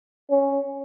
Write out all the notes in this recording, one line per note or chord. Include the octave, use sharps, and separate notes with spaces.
C#4